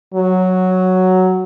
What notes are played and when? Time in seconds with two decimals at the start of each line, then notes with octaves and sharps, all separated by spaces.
0.14 F#3